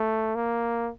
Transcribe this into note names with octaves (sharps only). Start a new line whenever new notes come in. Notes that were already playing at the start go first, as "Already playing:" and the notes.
Already playing: A3
A#3